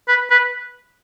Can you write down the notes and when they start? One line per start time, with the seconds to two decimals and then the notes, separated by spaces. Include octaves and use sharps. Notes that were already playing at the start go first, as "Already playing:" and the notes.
0.08 B4
0.30 B4